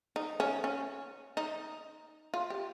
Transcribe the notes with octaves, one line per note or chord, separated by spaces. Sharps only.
D#4
C#4
C#4
D#4
F4
G4